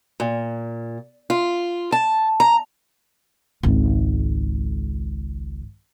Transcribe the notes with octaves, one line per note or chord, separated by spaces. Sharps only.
A#2
F4
A5
A#5
G#1 C#2